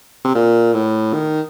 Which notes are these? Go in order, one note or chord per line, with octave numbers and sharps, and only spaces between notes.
C3
A#2
A2
D#3